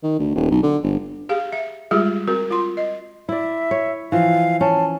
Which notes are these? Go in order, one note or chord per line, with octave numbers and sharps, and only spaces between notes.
D#3
D2
D#1
B1
D3
G1
G4 G#4 F5
E5
G3 G#3 F4 G4 G#4
C4 F#4 A#4
F4 C6
D#5
E4 D5 E5
C#5
E3 F3 F5
C#4 A5